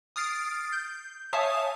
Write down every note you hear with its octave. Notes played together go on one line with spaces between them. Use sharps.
D#6 F6 A6 C7 D7
G6
C#5 E5 F5 G#5 A5 D#6